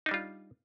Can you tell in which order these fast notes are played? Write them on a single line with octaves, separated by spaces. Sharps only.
D#4 D4 G3 F4